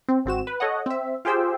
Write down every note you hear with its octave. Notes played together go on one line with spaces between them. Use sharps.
C4
G#1 C4 F#4 E7
B4
A4 C#5 D#5 F#5
C4 E5
F4 G4 G#4 C5 G5 E6